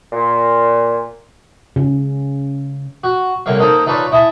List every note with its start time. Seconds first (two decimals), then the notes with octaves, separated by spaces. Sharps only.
0.12 A#2
1.76 C#3
3.04 F#4
3.46 C2 D3 A#3 C#5 F5
3.60 A#3 D#4 A4 A#4 C5
3.86 D#4 F4 A4 B4 C#5 D5
4.12 E4 D#5 G#5 A5